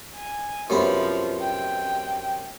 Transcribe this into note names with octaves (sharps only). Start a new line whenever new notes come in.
G#5
F#2 C3 F3 B3
G5